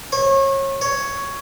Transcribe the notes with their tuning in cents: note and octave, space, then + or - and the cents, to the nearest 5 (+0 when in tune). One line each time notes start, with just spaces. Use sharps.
C#5 -30
C#5 +5